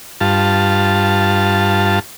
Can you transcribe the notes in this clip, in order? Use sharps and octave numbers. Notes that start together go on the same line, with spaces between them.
G2 F4 A5